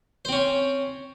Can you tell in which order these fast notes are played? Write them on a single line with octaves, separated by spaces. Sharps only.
C5 C4 C#4